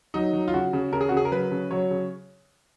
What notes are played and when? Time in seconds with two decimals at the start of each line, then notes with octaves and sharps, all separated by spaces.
0.14 F#3 D#4
0.33 F#3
0.48 F4
0.53 C#3 F#4
0.73 C#3
0.93 C#3 A#4
1.01 G#4
1.09 F#4
1.12 C#3 G#4
1.25 A#4
1.32 F#3 B4
1.52 C#3
1.71 F#3 C#5
1.91 C#3